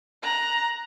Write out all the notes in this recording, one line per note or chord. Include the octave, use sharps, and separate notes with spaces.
A#5 F#6